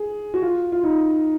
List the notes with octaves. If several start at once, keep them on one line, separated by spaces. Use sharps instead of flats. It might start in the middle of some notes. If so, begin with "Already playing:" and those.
Already playing: G#4
F#4
F4
F4
D#4